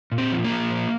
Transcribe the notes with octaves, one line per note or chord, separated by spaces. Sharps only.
A#2
C4
F3
A#3
F3
A#2